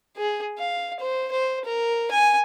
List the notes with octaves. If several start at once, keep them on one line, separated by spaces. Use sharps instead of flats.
G#4
F5
C5
C5
A#4
G#5